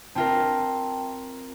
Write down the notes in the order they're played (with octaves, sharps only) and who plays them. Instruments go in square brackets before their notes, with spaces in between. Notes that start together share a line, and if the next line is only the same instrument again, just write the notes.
[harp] C4 F4 A#4 [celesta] E5 G5 A5